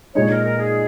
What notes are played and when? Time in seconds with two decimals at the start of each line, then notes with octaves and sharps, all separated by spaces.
0.15 A#2 G#3 D#4 C#5
0.30 A#4
0.44 A#4
0.59 G#4